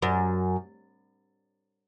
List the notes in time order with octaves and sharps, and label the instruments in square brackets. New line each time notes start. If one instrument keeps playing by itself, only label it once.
[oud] F#2